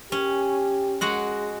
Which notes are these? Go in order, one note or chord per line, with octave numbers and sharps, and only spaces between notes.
C#4 G4
G#3 F#4 F#5